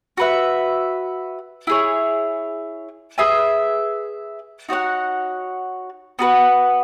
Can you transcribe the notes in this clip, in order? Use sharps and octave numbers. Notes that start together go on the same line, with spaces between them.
F#4 B4 E5
E4 G#4 C#5
G#4 B4 E5 G#5
D#4 F#4 C#5 F#5
B3 F#4 B4